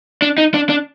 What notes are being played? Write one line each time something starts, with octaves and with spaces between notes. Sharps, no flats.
D4
D#4
D4
D4